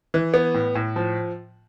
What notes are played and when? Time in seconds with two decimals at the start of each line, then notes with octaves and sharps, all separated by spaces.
0.14 E3
0.34 B3
0.54 A2
0.75 A2
0.96 F3